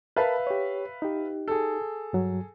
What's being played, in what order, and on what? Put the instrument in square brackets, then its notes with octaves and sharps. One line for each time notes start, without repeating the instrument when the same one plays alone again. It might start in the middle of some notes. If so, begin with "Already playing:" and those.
[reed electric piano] A#4 A5 B5 [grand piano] B4 E5 F5
[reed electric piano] G4 C#5
D#4 G4
[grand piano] G#4 A4
[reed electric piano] G2 F#3